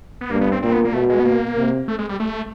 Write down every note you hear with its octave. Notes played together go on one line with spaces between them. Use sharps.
B3
G2 A#3
B3
C4
A#2 C4
B3
A#3
B2 A3
G#3
B3
A#3
C3
A3
G#3
G3
A3